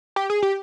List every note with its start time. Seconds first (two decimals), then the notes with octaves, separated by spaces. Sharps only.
0.16 G4
0.30 G#4
0.43 G4